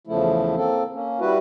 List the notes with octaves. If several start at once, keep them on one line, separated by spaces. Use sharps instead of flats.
E2 C#3 F3 A3 E4
A#3 C4 A4
A#3 C#4
G3 E4 F#4 B4